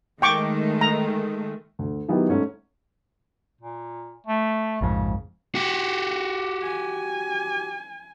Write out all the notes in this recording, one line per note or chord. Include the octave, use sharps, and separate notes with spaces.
D#3 G#3 A3 G5 C#6 D6
A#5
D2
D#3 F#3 B3 E4 G4
G#2 A3 C#4
A#2
A3
A#1 F2 G#2 C#3
F#4 G4
G#5